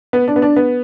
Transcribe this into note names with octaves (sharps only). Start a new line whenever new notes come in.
B3
D4
B3
D4
B3